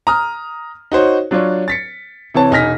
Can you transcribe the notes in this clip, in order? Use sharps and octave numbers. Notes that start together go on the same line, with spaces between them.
A#5 D#6 F6
D#4 F#4 C5 C#5
F#3 D4 F4 C#5
A6 B6 C#7
C3 E3 C#5 A5
E1 D#4 G#5 F6 A#6 B6